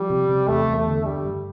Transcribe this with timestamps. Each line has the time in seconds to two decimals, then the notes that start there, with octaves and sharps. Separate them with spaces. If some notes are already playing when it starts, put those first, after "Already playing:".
Already playing: F3 G3
0.10 C3
0.29 C3
0.48 E2 A3
0.67 E2
0.77 A3
0.86 D3
1.05 G2 G3
1.25 G2